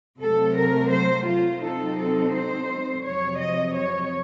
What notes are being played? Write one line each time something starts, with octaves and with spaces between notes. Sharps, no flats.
C3 F#3 A3 A4
A#4
C5
F4
C3 F#3 C4 D#4 A4
A4
C5
F2 C3 F#3 C#5
D#5
C#5